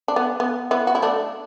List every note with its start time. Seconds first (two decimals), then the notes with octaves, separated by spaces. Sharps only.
0.08 D4
0.16 B3
0.40 B3
0.71 B3 E4
0.87 F#4
0.95 E4
1.02 A3 D4